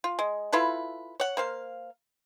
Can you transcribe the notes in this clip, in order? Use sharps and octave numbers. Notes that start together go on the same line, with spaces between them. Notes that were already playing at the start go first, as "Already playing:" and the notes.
F4
G#3
E4 F4 A4 B4
C#5 F#5
A#3 C5 F5